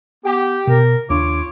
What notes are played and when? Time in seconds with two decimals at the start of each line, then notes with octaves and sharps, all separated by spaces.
0.25 B3 G4
0.67 B2 A#4
1.10 D#2 D4 F4 C#5 D6